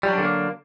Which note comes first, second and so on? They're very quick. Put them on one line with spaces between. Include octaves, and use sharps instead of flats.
G3 F#3 D4 D3 A#3